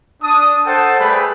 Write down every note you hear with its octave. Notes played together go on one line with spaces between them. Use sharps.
D4 D#6
A4 C5 F#5 G5 A5
G3 A3 G#4 B4 B5